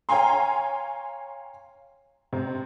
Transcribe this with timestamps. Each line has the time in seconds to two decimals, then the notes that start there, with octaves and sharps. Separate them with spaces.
0.09 C#5 F5 G5 G#5 A#5 C6
2.33 C3